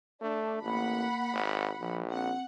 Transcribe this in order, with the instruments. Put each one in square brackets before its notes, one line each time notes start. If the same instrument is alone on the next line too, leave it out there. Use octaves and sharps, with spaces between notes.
[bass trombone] A3 [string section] D4
[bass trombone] A1 [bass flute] A#3 [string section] F#5 B5
[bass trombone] G#1
[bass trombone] A#1 [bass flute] F3
[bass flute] C4 [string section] F#5